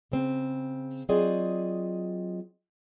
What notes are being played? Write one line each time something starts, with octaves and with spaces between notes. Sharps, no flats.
C#3 C4
F#3 C4 F4 G#4 D5 D#5